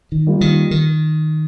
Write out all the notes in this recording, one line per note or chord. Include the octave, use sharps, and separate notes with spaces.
D#3
G3 A#3 F4
D#3
D#3